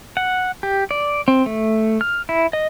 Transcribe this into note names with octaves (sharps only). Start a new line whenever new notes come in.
F#5
G4
D5
C4
A3
F6
E4
D#5